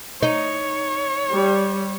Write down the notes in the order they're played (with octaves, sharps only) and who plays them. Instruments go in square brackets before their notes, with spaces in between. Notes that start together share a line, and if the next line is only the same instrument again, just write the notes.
[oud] D#4 [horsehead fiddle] C#5
[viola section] G3